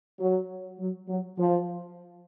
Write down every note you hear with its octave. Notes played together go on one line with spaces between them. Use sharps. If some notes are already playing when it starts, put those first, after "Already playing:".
F#3
F#3
F#3
F3